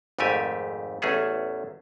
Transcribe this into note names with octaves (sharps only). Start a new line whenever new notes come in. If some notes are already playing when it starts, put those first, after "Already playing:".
G#1 F2 G#2 A3 G4 G#5
A1 E2 A3 C#4 G#4 A4